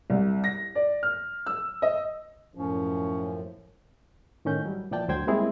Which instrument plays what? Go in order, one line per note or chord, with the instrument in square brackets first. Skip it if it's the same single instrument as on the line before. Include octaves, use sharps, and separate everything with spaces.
[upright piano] C2
A#6
D5
F6
E6
D#5
[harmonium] F#2 A2 F3 [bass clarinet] C#4
[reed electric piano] A2 D#3 C#4 G6
F#3 G3
A#2 E3 F3 D5 G5 A5
D2 F#3 C5 G5 G#6
G3 G#3 A#3 C4 E4 G#4